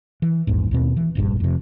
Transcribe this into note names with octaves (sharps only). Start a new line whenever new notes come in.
E3
A#1 E2 G#2
D#2 B2 C4
E3
F1 A#1 G2
F2 C3